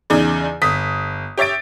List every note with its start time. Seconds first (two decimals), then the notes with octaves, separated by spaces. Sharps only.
0.10 E2 C#3 D#4 G#4 D5
0.62 G1 D#6 B6
1.37 G4 C#5 E5 A6 D7